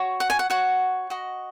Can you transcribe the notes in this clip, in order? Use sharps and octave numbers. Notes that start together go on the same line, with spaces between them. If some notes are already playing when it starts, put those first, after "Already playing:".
Already playing: F#4 C#5
F#5
G#5
F#5
F#4 C#5 F#5
F#4 D#5